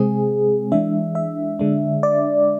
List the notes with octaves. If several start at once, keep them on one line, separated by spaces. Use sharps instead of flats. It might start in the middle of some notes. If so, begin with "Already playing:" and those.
Already playing: C3 G#3 C4 G#4
E3 G#3 D4 E5
E5
D3 G#3 D4
D5